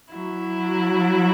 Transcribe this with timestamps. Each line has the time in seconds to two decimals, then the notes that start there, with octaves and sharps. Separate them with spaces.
0.13 F#3 E4